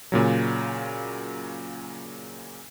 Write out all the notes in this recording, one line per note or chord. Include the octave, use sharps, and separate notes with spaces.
A#2 C#3 F#3